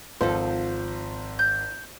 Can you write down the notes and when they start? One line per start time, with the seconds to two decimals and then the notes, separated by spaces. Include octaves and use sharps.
0.21 G#1 F3 C4 A4 C5
1.39 G6